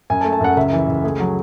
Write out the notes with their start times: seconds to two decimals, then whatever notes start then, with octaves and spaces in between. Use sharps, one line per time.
0.10 F#2 G#5
0.21 A5
0.25 A3
0.32 A5
0.40 F#2 F#5
0.57 C#2 E5
0.73 E3
0.88 C#2
1.04 A3 G#4
1.20 F#3